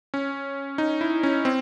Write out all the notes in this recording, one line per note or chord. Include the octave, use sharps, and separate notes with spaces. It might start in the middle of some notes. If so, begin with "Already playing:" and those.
C#4
D#4
E4
C#4
C4